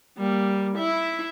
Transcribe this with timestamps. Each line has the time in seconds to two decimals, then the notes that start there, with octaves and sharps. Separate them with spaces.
0.18 G3 A#3
0.77 E4 E5